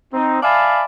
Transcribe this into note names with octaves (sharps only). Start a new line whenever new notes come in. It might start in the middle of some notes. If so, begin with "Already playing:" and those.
C4 D#4
D5 E5 F5 G#5 A5 B5